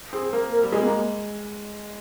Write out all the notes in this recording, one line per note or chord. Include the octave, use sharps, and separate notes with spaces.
C4 G#4
A#3 A#4
A#4
G3
G#3 G#4
C4
A#3